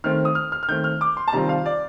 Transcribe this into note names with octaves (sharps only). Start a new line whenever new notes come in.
D#3 A3 C4 F6
D#6
F6
F6
F6
D#3 A3 C4 G6
F6
D6
C6
A5
C3 D#3 G3 C4 F4 A#5
F5
D5